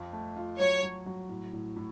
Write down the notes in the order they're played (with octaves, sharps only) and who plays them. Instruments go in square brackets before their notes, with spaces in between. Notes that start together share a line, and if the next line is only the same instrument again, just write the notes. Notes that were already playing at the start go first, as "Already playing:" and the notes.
Already playing: [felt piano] F2 F3 F4
A3
F4
[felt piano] F#3 [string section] C#5
[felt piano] F#3
F#3
A2
A2
A2